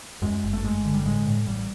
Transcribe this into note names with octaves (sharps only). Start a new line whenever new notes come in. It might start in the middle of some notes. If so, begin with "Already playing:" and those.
F#2 G#3
G1
A3
G1 G#3
D3
G3
A2 G#3
A2
A1 G3